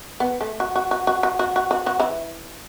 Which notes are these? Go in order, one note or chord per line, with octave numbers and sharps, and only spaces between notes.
B3
A3
F#4
F#4
F#4
F#4
F#4
F#4
F#4
F#4
F#3 F#4
E3 E4